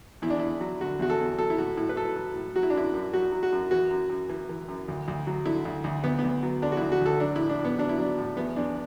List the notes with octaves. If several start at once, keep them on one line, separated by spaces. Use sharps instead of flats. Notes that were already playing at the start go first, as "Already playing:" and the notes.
E2 E4
D4
E2 E4
F#3
D3 F#4
E2 F#4
A4
E2
F#3 A4
E4
A2 F#4
A2 E4
B4
F#3 A4
F#3
A2
F#3 F#4
E4
D4
F#2 E4
F#2
F#3 F#4
F#3
F#4
F#2
E3 F#4
F#2
F#2
E3
E3
F#2
D2
D2
F#3
D3 E4
D2
D2
D2 B3
B3
D2
F#3
D3 D4
F#4
D2 E4
F#4
D2 A4
F#3 D4
A2 E4
D4
A2
B3
F#3 D4
E4
F#3 D4
A2
E2 B3
E2 D4